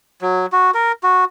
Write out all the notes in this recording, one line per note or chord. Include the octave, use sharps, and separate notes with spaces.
F#3
F#4
A#4
F#4